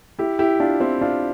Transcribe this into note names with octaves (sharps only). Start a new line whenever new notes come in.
E4 G4
E4 G4
D4 F4
C4 E4
D4 F4